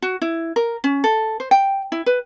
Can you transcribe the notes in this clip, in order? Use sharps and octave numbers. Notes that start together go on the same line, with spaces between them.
F#4
E4
A#4
C#4
A4
C5
G5
E4
B4